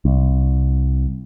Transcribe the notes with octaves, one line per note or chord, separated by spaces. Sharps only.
C2